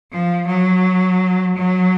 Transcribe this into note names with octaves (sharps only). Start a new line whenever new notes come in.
F3
F#3
F#3